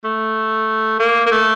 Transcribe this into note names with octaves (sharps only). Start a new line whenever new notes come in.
A3
A#3
A#3
A3